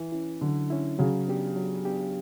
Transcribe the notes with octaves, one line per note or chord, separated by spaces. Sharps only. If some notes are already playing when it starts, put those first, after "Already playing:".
Already playing: E3
C#4 E4
D3 F#3
C#4 E4
C#3 F#3
B3 D4 G4
F#3
B3 D4 G4